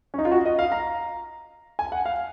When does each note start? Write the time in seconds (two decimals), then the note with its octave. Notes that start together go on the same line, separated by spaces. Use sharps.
0.14 C#4
0.18 D#4
0.25 F4
0.31 F#4
0.45 D#5
0.59 F5
0.72 A#5
1.79 G#5
1.92 F#5
2.06 F5